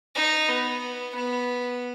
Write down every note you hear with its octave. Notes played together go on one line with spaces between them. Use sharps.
D#4
B3
B3